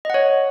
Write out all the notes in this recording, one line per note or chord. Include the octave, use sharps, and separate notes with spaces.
C#5 D#5 F#5